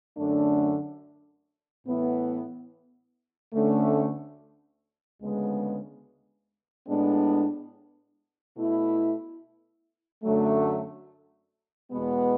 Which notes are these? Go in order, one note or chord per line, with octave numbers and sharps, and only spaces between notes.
F#2 D3 A3 D4
A2 E3 B3 E4
D2 D3 A3 C#4
D2 C#3 G#3 B3
A2 G#3 B3 D4
B2 A3 E4
F#2 D3 F#3 A3
E2 B2 G#3 B3